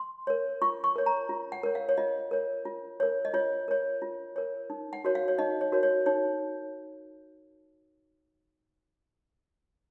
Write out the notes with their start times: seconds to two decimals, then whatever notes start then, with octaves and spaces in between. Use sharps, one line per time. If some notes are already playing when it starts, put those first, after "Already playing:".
Already playing: C6
0.27 A#4 C#5
0.62 F4 C#6
0.84 C#6
0.96 A#4 C#5
1.06 A#5
1.29 F4
1.52 F#5
1.63 A#4 C#5
1.75 F5
1.89 C#5
1.97 F4 D#5
2.31 A#4 C#5
2.65 F4
3.00 A#4 C#5
3.25 D#5
3.34 F4 C#5
3.68 A#4 C#5
4.02 F4
4.36 A#4 C#5
4.70 D#4
4.93 F#5
5.05 F#4 A#4 C#5
5.15 F5
5.28 C#5
5.38 D#4 D#5
5.61 C#5
5.72 F#4 A#4 C#5
5.83 C#5
6.06 D#4 C#5